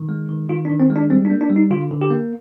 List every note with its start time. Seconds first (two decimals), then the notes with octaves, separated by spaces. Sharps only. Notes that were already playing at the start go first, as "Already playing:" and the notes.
Already playing: D#3
0.09 G#3
0.29 D#3
0.49 D#3 F4
0.65 D4
0.69 D#3
0.80 C4
0.90 G#3
0.96 D4
1.10 G3 C4
1.25 D4
1.30 A#3
1.41 D4
1.50 G3
1.56 D#4
1.71 D3 F4
1.91 D3
2.01 G4
2.11 A#3